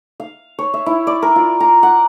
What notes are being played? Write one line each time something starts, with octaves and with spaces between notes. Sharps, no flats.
F5
C#5
E5
E4
D5
A#4
F4
A#5
F#5